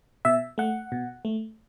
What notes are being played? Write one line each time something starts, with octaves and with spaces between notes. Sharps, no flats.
B2 E5
A3 F#5
B2
A3